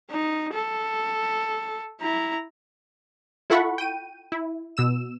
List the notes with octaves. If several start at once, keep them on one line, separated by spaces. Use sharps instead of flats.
D#4
A4
E4 A#5
E4 F4 A4 F#5 B5 C#6
G5 D#7
E4
B2 E6 E7